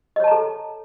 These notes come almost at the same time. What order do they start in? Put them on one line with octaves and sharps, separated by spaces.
D#5 C#5 A5 A#5 A4